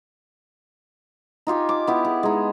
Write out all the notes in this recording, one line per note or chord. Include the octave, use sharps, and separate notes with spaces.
D#4 F4 G4 G#5
D6
B3 E4 G4
G#4
G#3 D#4